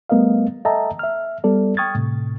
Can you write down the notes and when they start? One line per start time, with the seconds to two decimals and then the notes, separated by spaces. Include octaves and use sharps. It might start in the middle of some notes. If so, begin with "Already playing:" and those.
0.10 G3 A3 B3 A#4 D#5 F5
0.65 A4 D#5 E5 G5 A5 A#5
0.99 E5 F6
1.44 G3 B3 A4 D5
1.77 G5 C#6 D#6 F6 G#6 A6
1.95 A2 C3